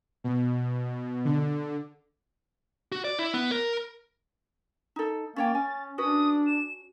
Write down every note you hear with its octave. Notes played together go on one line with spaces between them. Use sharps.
B2
D3
F#4
D5
E4
B3
A#4
D#4 A4
A#3 C#4 C#5 G5 A6
C#4 G#5
C#4 D4 F#4 B4 D#6
E7